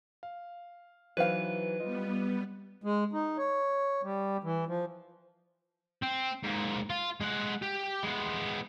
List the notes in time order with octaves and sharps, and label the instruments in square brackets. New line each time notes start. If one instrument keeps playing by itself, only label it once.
[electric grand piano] F5
[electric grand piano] E3 F#3 D#4 [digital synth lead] B4 [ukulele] C5 F5
[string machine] G3 B3 [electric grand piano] F4 D#5
[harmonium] G#3
D#4
C#5
G3
E3
F3
[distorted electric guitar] C4
G#2 A#3
F4
G#3 F#5
G4
G#3 B3